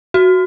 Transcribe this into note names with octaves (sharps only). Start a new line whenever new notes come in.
F#4